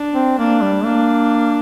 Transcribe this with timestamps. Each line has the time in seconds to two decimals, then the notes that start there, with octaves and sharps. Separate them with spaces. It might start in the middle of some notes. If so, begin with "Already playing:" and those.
Already playing: D4
0.14 C4
0.38 A#3 D4
0.62 G3
0.85 A#3 D4